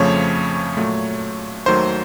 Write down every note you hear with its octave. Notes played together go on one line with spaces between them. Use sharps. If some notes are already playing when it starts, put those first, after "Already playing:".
Already playing: F2 C#3 F3 A3 C#5
A#2 F#3 A3
D#2 D#3 F#3 A3 C5